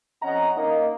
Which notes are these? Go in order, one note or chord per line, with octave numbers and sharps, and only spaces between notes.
F2 C#4 D#5 F#5 A#5
A#3 D#4 D#5